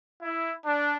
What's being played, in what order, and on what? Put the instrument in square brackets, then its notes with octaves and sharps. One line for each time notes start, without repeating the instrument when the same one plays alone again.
[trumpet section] E4
D4